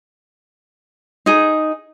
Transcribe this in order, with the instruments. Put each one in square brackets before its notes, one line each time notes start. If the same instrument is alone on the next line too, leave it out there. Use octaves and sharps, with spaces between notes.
[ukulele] D#4 G#4